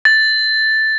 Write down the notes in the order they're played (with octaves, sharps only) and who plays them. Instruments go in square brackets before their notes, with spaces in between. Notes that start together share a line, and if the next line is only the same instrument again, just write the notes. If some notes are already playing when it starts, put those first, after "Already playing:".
[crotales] A6